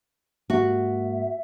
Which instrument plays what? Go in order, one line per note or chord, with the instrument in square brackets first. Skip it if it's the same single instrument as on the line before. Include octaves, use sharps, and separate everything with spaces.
[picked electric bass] G#2 A#3 [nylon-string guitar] F#4 [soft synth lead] E5